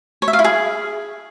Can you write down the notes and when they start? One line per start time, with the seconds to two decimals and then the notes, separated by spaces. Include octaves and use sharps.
0.22 C#5
0.28 E5
0.33 F5
0.39 E4
0.44 G#4